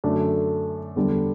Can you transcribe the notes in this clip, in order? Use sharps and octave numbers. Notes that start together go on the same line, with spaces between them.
F#2 D3 A3 D4
E2 D3 G3 D4